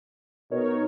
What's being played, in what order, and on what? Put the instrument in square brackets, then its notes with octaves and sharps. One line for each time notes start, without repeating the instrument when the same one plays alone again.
[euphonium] B2 [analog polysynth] D#4 A#4 C#5